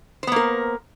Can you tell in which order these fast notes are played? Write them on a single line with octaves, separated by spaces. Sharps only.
C5 B3 A#3 A#4